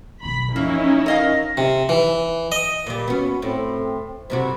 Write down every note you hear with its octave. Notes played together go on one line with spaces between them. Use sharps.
F#1 B1 B5
E3 F3 A#3 C#4 D#4 E4
A#4 D#5 F5
C3
E3
D#5
A#2 G3
B3 C#4 F#4
A2 C4
G2 C3 F#4 C5